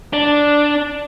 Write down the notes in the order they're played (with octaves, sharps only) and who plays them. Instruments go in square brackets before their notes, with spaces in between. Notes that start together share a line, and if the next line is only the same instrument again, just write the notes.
[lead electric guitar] D4